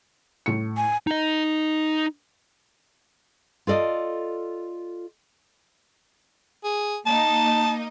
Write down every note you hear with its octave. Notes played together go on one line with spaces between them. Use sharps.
A2 C#7
G#5
D#4 D#5
F4 A4 D5 D#5
G#4
A#3 D#4 D#5 A5